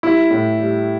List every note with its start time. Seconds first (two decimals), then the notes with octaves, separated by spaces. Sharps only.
0.03 G3 E4
0.31 A2
0.59 G3